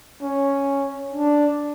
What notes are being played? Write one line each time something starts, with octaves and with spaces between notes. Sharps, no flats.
C#4
D4